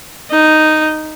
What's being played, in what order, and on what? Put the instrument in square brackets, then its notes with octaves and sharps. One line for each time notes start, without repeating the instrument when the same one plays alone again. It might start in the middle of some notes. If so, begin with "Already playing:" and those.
[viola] D#4